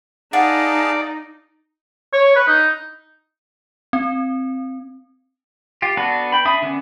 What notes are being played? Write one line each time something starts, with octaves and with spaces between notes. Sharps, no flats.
D#4 G#4 D5 F5 F#5 A5
C#5
B4
D#4
C4
F4 G4
B3 D4 F#4 A4 B4
G5 B5
D4 E5 B5 D#6
D3 B3 C#4